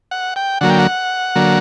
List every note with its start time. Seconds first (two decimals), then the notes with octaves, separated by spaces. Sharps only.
0.11 F#5
0.36 G5
0.61 D3 F#3 A#3 F#5
0.70 G5
0.79 F#5
1.36 D3 F#3 A#3